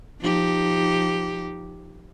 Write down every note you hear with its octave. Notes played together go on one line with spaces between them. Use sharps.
F3 D#4 G4